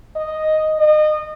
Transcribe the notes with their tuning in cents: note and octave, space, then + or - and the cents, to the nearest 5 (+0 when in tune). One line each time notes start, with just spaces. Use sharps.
D#5 +0
D#5 -30